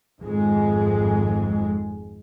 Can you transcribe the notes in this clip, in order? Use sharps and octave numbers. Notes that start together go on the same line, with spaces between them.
G#1 F2 G#2 G#3